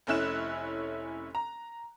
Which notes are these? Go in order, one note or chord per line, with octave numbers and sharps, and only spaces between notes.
F1 A3 C#4 E4 F#6 E7
A#5